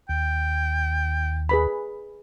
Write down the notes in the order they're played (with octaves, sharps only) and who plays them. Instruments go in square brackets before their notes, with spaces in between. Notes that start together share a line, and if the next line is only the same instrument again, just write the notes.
[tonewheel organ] D#2 [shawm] G5
[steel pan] G#4 B4 B5